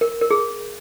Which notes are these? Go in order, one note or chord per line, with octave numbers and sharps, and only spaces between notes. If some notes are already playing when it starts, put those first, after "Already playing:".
A#4
A#4
G#4